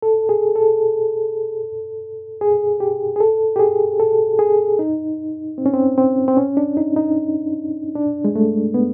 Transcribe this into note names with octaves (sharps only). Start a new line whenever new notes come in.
A4
G#4
A4
G#4
G4
G#4
A4
G4
G#4
A4
G#4
D#4
C4
C#4
C4
C4
C4
C#4
D4
D#4
D#4
D4
G#3
A3
B3